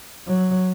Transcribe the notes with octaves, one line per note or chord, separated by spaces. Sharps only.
F#3